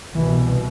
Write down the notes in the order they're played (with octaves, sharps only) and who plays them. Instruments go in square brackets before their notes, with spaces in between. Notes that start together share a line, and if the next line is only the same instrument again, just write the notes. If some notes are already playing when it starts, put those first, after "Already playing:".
[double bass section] C2 B2 E3